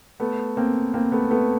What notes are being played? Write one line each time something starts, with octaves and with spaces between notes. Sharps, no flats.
A3 B3
A#3 C4
A#3 C4
A3 B3
A3 B3